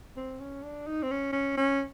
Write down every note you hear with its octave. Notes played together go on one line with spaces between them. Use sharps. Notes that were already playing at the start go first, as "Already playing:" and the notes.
C4
C#4
D4
D#4
C4
C#4
C#4
C#4